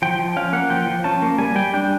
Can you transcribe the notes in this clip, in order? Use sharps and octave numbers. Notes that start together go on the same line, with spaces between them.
F3 G5
F3
C#4 F5
A#3 F#5
F3 G5
F3
C#4 A5
A#3
G3 G#5
G3 G5
D4 G5